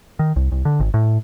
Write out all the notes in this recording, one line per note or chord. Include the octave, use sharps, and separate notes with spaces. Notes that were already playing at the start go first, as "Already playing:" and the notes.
D#3
C2
C2
D3
G#1
A2